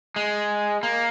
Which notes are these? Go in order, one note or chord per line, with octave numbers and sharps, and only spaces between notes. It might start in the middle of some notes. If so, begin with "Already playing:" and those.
G#3
A#3